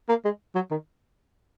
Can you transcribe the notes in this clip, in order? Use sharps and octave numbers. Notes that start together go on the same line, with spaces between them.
A#3
G#3
F#3
D#3